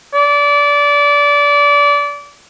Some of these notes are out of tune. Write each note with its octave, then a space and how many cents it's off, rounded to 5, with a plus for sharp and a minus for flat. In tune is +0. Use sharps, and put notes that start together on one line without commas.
D5 -25